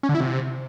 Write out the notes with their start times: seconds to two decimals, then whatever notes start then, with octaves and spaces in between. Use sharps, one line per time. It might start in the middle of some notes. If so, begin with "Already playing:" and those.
0.03 C#4
0.09 D3
0.15 E4
0.20 C3